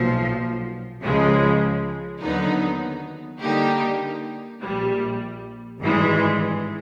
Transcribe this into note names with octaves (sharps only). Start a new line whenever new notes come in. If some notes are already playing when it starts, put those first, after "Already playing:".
Already playing: B1 A#2 F3
C#2 C#3 F3 G#3
D#2 D3 F#3 B3 D#4
D3 G3 A#3 D#4 G4
A#1 A#2 G3
G#1 G2 E3 G#3